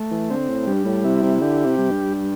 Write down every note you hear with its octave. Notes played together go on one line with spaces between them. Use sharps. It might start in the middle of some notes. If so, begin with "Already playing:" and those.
Already playing: A3
E3
D3 C4
A2
G2 G3
A2
C3 E4
C3
D3 G4
C3
G3
G2